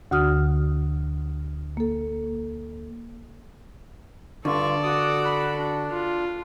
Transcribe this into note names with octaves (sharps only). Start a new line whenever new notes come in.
D2 D3 F#4 D#6 F6
A#3 A4
G2 D3 F4 A4 D5 C#6
F#4 D6 D#6
B5
D4
F4